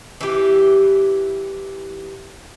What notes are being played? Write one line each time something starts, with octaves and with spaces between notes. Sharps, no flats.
E3 G4